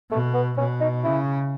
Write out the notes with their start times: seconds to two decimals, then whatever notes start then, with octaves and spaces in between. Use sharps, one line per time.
0.11 B2 A3
0.34 B3
0.57 B2 C#4
0.81 D#4
1.04 C#3 E4